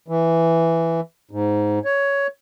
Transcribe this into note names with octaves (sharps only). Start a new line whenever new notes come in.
E3
G#2
C#5